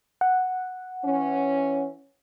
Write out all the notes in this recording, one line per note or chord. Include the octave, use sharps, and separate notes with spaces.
F#5
E3 C#4